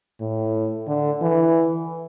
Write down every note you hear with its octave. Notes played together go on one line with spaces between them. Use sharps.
A2
D3
E3